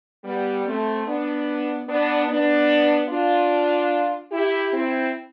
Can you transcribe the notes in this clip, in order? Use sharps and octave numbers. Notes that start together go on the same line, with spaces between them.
G3 B3
A3 C4
B3 D4
B3 D4
B3 D4
D4 F4
E4 G4
C4 E4